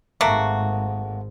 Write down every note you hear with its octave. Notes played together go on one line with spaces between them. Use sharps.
G#1 G#2 A3 A#3 F#4